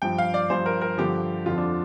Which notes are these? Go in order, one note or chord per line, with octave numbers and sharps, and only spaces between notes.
G2 F3 G5
F5
D5
G2 F3 C5
A#4
A#4
G2 D3 F3 G4
F2 D3 F3 F4
D4